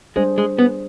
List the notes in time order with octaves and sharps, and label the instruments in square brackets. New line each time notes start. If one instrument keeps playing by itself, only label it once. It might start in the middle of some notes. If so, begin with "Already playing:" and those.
[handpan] G3 D4 G#4 C5 [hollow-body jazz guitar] G#3
[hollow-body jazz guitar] G#3
B3